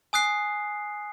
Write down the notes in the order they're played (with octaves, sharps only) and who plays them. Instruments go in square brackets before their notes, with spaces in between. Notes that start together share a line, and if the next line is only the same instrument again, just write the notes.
[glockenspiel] G#5 D#6 F#6 C7